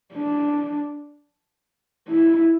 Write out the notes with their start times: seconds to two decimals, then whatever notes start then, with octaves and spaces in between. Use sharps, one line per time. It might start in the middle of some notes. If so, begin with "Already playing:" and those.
0.14 D4
2.08 E4